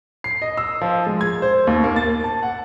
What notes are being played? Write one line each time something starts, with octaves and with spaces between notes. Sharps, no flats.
C7
D#5
E6
F3
G#3
G#6
C5
D#2
A#3
A6
A5
F#5